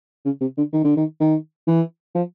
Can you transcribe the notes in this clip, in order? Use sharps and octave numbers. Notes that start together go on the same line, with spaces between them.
C#3
C3
D3
D#3
D3
D#3
D#3
E3
F3